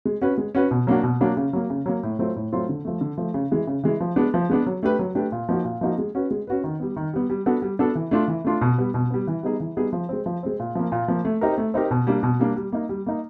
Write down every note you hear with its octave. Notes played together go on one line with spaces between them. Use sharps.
G#3
C#4 F#4 B4
G#3
C#4 F#4 B4
B2
F#3 A#3 D4 F#4
B2
F#3 A#3 D4 F#4
C#3
F#3 A#3
C#3
F#3 A#3
A2
F#3 A3 C4 F4
A2
F#3 A3 C4 F4
D3
F3 A3
D3
F3 A3
C#3
E3 G#3
C#3
E3 G#3
F3
G#3 B3 D4
F3
G#3 B3 D4
F#3
A3 D4 G4 B4
F#3
A3 D4 G4 B4
A#2
F3 A#3 D#4 F#4
A#2
F3 A#3 D#4 F#4
G#3
C#4 F#4 B4
G#3
C#4 F#4 B4
D#3
G3 B3
D#3
G3 B3
G3
B3 D4 F#4 A4
G3
B3 D4 F#4 A4
E3
A3 D4 F4
E3
A3 D4 F4
B2
G3 B3
B2
G3 B3
E3
G3 B3 D#4 G#4
E3
G3 B3 D#4 G#4
F3
G#3 C4
F3
G#3 C4
A#2
F3 A#3
A#2
F3 A#3
A3
C4 D#4 G4 A#4
A3
C4 D#4 G4 A#4
B2
G3 A#3 D4
B2
G3 A#3 D4
G3
A#3 D#4
G3
A#3 D#4